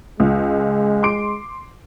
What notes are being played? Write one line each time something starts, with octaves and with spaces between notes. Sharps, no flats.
C#2 G#3
C6 D6 D7